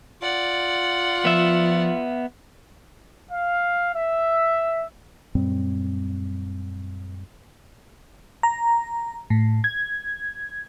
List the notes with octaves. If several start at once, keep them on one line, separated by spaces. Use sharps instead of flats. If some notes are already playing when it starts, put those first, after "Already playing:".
F4 D5 F#5
F3 B3 E5
F5
E5
F#2 A#2 G3 C4
A#5
A2
G#6